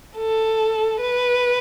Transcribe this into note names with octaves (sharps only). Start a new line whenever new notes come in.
A4
B4